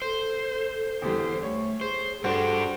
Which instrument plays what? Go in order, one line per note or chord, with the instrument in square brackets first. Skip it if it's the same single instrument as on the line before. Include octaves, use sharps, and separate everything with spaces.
[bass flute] A4 [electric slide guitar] C5
[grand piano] E2 D3 G3 [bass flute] E4
[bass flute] A3 [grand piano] C#5
[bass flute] G#4 [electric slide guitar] C5
[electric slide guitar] G2 D4 [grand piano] F#4 C5 [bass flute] A4